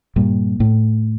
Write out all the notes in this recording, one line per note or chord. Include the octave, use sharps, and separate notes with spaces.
G2 A#2
A2